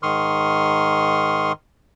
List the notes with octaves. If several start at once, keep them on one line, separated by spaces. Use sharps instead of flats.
G#2 D#3 C6 C#6 D#6 F6